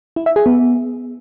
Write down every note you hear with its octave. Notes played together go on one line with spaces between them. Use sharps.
E4
E5
G#4
B3